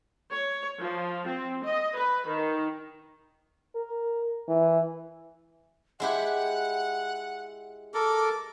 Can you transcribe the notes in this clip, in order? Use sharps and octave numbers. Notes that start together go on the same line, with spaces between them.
C#5
F3
C4
D#5
B4
D#3
A#4
E3
G#3 E4 G4 F#5
A4 A#4 D6